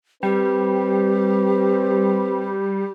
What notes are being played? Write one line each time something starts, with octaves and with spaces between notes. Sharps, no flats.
G3 C4 G4 B4